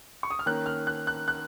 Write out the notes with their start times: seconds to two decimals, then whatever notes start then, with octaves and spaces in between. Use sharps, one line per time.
0.23 C#6
0.30 D#6
0.39 F6
0.46 D#3 A#3 C#4 F#6
0.66 F6
0.87 F#6
1.07 F#6
1.28 F#6